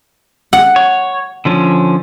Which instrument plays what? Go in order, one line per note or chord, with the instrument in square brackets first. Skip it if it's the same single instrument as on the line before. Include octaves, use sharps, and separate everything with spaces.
[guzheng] F#5
[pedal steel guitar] C#5
D3 F3 C#4